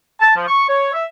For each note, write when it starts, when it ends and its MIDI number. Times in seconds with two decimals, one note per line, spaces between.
0.20 0.33 81
0.36 0.44 53
0.47 0.65 85
0.68 0.92 73
0.93 1.03 76